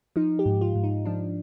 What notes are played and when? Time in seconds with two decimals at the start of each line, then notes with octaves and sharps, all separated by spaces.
0.16 F3 D#4
0.39 G4
0.46 G#2
0.61 F4
0.75 G#2
0.84 D#4
1.05 F3 D4